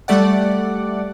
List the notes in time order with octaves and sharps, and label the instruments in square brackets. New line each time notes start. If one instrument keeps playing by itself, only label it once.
[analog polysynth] G3 A3 D5 F#5